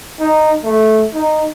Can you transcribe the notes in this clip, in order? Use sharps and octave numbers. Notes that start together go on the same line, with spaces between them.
D#4
A3
D#4